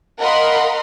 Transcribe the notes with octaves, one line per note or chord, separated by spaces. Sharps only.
A#4 D#5 F5 F#5 B5 C6